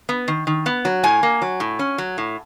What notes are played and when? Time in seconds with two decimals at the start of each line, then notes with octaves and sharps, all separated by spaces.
0.09 B3
0.28 D#3
0.47 D#3
0.66 B3
0.85 F#3
1.04 A2 G#5
1.23 A#3
1.42 F#3
1.60 A2
1.79 C#4
1.98 F#3
2.18 A2